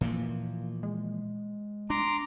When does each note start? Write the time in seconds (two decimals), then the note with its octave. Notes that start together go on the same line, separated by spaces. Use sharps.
0.01 A#2 E3 F3 A#3
0.83 G#3
1.90 D4 A#5 C6 D6